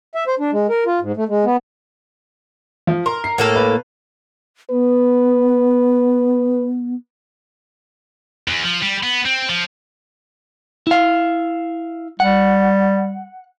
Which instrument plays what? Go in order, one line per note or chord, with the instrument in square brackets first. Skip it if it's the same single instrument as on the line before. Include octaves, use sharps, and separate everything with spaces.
[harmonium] E5
C5
D4
G#3
A#4
F4
G#2
A3
G#3
B3
[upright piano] F3
[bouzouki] A#4 [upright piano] C6
[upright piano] C7
[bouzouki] A2 A#3 A4
[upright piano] B4
[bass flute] B3 [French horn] B4
[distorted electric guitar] E2
F3
G3
B3
C4
F3
[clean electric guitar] E4 F5
[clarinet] G3 [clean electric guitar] F#5